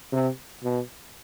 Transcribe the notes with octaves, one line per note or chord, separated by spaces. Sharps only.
C3
B2